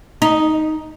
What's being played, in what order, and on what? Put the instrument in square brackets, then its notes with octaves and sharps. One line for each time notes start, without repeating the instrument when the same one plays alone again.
[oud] D#4